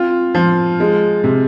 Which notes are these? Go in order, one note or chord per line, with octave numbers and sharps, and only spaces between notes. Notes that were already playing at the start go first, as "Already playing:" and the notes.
Already playing: C4 F4
F3
G#3
C3